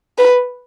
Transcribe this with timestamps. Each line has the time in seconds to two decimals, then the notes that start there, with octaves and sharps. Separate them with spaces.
0.18 B4